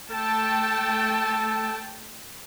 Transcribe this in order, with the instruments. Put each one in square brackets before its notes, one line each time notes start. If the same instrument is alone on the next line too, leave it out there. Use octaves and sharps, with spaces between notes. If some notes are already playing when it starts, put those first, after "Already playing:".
[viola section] A3 G5 A5 [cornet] A4